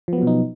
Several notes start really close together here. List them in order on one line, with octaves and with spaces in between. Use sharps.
F3 B3 F#3 B2 D#4